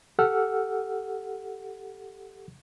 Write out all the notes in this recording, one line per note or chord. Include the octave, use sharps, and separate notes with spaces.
G4 A4 F#5 E6 F6